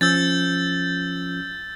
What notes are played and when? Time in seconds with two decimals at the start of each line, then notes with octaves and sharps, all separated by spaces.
0.01 F3 C#4 E6 G6 A6